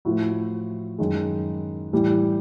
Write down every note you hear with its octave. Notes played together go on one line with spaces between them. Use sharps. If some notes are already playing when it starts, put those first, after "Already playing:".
A2 F3 A3 E4 F#4
F#2 D#3 G#3
A2 E3 G3